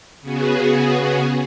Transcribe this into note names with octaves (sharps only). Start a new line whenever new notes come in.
C#3 B3 F#4 G#4